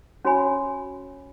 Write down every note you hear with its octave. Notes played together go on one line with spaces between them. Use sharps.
C#4 F#4 C#5 G#5 B5